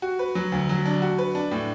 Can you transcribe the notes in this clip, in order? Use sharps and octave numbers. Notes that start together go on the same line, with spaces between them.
F#4
B4
F#3
D2
F#3
D4
F#4
B4
D4
A2